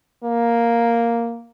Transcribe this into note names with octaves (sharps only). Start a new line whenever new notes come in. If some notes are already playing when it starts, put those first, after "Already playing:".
A#3